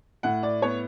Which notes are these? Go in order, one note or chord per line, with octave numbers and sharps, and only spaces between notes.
A2 F#5
D5
B3 C#5